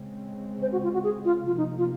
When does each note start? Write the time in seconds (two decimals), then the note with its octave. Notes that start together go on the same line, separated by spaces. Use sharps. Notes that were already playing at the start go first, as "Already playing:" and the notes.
Already playing: C#3 G#3 C4
0.62 C5
0.72 F#4
0.83 F4
0.94 F#4
1.04 G#4
1.25 F4
1.46 C3 F3 A#3 F4
1.57 D#4
1.78 F4